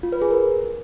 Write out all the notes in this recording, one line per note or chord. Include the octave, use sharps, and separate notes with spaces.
F4
B4
G#4
A#4